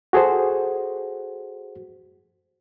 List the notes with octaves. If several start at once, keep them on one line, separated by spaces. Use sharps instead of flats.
F#4 G#4 A4 C5